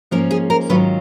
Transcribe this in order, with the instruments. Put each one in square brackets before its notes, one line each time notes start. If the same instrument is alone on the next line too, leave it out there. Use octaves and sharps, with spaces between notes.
[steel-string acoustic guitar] G#2 F3 A#3 C#4 A#4
G#4
A#4
G#2 D#3 F#3 C#4 F4 B4